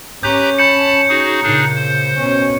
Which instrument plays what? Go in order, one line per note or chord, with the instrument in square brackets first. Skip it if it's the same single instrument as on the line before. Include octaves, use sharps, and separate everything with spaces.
[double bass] C#4 [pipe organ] G4 B4 A#5 [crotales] G6
[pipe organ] A5 B5 [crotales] G6 C#7
[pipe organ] D#4 F#4 G#4
[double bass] A#2 C#3 [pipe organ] D4 D#4 G#4
[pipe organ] C5
[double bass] B2 C#4